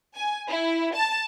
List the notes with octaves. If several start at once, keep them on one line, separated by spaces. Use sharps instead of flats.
G#5
E4
A5